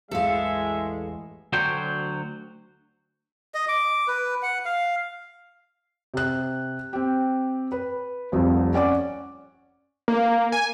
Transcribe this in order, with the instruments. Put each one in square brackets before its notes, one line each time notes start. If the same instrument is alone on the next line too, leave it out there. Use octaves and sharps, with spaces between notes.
[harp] A1 E2 C#7 [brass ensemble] G#3 [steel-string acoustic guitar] A4 F5 [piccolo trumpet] E5
[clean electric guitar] D2 D3 F#3 C5 C#5 G5
[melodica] D#5
D6
B4
F#5
F5
[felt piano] C3 F#6
C4 G4
B4
F1 C2 F2
C#4 D5 F#5 D6
[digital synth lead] A#3
G#5